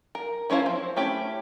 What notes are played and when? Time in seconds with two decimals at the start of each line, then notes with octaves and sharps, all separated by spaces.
0.15 A#4
0.50 F3 C#4 E4 C5 F5
0.66 C4
0.96 A3 C#4 E4 G4